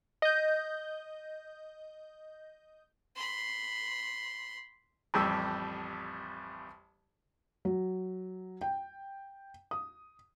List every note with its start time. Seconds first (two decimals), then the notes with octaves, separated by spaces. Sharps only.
0.22 D#5 G6
3.16 B5 C6
5.14 A1 F2 G3 G4 E6
7.65 F#3
8.61 G5
9.71 D#6